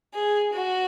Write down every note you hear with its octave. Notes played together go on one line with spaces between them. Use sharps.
G#4
F#4